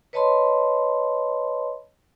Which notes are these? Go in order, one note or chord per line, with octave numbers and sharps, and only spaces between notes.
B4 C#5 D#5 A5 B5 C6